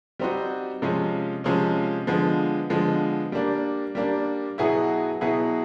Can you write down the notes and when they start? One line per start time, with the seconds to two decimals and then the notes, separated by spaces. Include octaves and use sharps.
0.19 G3 C4 D#4 F#4
0.82 C3 F3 G#3 C#4
1.44 C3 F3 G#3 C#4
2.07 D3 F3 G#3 B3
2.70 D3 F3 G#3 B3
3.32 G3 A#3 D4
3.95 G3 A#3 D4
4.58 B2 F#3 B3 E4 G#4
5.21 B2 F#3 B3 E4 G#4